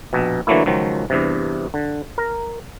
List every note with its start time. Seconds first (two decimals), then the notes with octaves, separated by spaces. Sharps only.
0.13 A#1 B2
0.47 D3 E3 F#3 A3 A#3 E4
0.66 C#2 D#3 F3 F#3
1.10 E2 G2 C3
1.74 D3
2.18 A#4